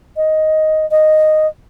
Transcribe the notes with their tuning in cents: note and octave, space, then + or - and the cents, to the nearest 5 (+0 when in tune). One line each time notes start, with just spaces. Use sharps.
D#5 +5
D#5 -5